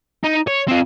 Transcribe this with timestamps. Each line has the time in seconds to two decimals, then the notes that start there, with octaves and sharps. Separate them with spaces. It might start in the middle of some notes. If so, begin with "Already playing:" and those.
0.24 D#4
0.48 C#5
0.69 C4 F4